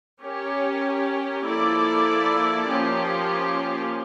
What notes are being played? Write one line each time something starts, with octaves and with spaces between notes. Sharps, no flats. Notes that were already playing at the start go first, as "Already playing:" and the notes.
C#4 G4 A#4 C#5
F3 A#3 E4 A4 D5
F3 A#3 C#4 G4